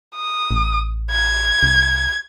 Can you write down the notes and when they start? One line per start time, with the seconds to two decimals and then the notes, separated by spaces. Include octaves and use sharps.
0.16 D#6
0.51 A1
1.12 G#6
1.63 C2